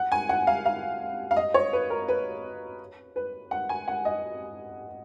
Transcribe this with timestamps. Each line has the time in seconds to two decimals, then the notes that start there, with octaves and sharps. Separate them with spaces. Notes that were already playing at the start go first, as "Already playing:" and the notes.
Already playing: F#5
0.12 G#5
0.29 F#5
0.47 F5
0.66 F5
1.31 F5
1.36 D#5
1.54 C#5
1.73 B4
1.90 A#4
2.08 B4
3.16 B4
3.51 F#5
3.69 G#5
3.88 F#5
4.05 D#5